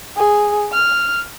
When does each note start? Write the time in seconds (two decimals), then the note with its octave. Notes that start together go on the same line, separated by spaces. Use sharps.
0.16 G#4
0.73 F6